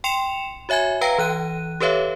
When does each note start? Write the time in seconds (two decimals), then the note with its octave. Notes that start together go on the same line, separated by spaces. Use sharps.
0.04 G5 C6 C#7 E7 F7
0.69 F#4 C#5 E5 G#5 G#6
1.01 B4 F5 G5 A#5 A#6
1.18 E3 F#6 D#7
1.80 G4 A4 B4 C#5 E5 F5